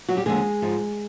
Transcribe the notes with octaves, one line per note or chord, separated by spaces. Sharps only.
F#3 F#4
G3 G4
D#2 D3 F3 G#3 G#4
G#2 F3